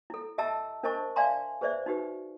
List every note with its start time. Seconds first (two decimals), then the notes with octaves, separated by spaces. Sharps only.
0.10 E4 A4
0.38 G4 D#5 E5 A5 A#5 E6
0.83 D4 A#4 C5 D#5 A5 C#6
1.16 D5 E5 F5 G#5 A#5 C6
1.61 G#4 B4 C5 D5 E5
1.86 D#4 F#4 G4 B4